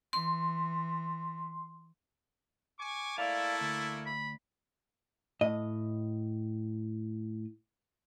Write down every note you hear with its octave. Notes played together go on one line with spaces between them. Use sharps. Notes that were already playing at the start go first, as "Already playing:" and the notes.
E3 C6
G#5 C#6 D6
A3 A#3 E4 D5 F5 A5
D2
B5
A2 D#5